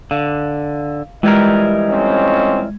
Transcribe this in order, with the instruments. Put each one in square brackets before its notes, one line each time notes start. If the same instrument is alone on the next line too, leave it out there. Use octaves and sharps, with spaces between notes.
[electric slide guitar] D3 [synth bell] F5
[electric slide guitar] E3 G3 A#4 [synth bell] G#3 G#6 [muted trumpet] D#5
[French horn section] F2 C4 C#4